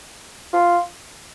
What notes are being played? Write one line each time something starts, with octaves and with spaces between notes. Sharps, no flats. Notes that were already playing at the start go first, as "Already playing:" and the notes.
F4